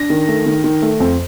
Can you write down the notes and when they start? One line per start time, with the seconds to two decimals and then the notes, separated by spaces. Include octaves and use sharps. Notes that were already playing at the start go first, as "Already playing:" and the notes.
Already playing: D4 A#6
0.10 D#3
0.28 A3
0.46 D#3
0.64 D#3
0.82 A3
1.00 F2